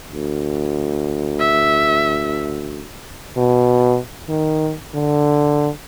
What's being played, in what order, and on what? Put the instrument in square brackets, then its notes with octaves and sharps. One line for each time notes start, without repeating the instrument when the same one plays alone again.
[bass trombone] D2
[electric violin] E5
[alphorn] B2
D#3
D3